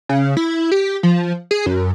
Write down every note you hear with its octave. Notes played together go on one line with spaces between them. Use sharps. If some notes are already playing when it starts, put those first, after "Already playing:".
C#3
E4
G4
F3
G#4
F#2